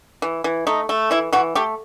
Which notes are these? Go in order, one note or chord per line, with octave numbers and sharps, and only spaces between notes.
E3
E3
A3 D#4
A3
E3 E4
E3 F#4
A3 G4